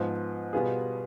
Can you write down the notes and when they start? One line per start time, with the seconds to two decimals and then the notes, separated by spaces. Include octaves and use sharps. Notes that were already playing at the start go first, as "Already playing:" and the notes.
Already playing: G#2 F3 B3 F4
0.53 B2 G3 B3 F4 G#4